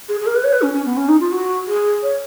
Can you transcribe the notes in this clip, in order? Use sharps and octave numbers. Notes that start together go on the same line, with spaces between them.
G#4
G#4
A#4
B4
C#5
B4
C#4
C#4
B3
C#4
D#4
F4
F#4
G#4
C#5